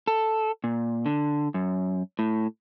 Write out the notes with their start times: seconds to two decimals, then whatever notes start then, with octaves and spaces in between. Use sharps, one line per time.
0.07 A4
0.64 A#2
1.06 D3
1.54 F#2
2.19 A2